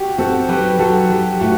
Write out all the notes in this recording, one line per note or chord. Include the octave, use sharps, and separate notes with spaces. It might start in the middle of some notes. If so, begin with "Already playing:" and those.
Already playing: F#4 G4
C4 F#4 A4
F#3 G4 B4
F#3 F#4 A4
F#3 G4
A2 F#4